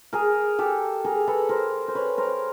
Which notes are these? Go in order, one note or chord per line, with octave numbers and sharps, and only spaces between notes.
G#4 A#4
G4 A4
G#4 A#4
A4 B4
A#4 C5
C5
B4 C#5
A#4 C5